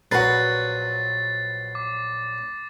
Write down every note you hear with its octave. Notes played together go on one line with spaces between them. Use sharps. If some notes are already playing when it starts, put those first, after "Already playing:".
A#1 F#3 F#4 A#4 B4 A6 C7
D6